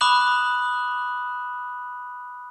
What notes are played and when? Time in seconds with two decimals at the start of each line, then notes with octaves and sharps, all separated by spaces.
0.01 B5 D6 D#6 F#6 E7 F#7